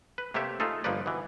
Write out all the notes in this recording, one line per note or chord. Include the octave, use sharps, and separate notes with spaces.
B4
C3 A3 A#3 G4 C#5 E5
A3 D#4 F4 G#4 A4
G1 F3 A#3 D#4 B4 D5
B2 E3